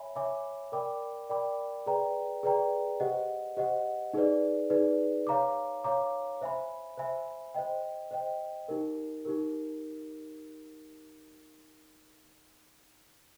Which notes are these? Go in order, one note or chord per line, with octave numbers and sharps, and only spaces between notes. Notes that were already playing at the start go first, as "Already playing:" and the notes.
Already playing: C#5 E5 G#5 B5
C#5 E5 G#5 B5 D6
A#4 D5 G5 B5 D6
A#4 D5 G5 B5 D6
G#4 B4 D5 G5 A#5
G#4 B4 D5 G5 A#5
G4 C5 D#5 F#5
G4 C5 D#5 F#5
D#4 G#4 B4 D5
D#4 G#4 B4 D5
C#5 F5 A#5 D6
C#5 F5 A#5 D6
C5 E5 G#5 B5
C5 E5 G#5 B5
C5 D#5 G5
C5 D#5 G5
D#4 G4 A#4
D#4 G4 A#4